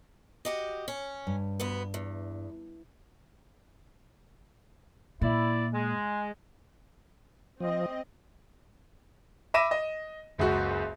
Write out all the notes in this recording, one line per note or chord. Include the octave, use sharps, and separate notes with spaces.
F#4 G4 D#5
C#4
G2
D2 B3
E2
A#2 E4 D5
G#3
F3 C4 D#5
E5 B5 D6 A#6 D#7 E7
D#5
F#1 C#2 F#2 F#4